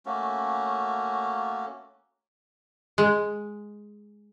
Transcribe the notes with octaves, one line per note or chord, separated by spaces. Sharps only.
A3 A#3 C#4 F#4
G#3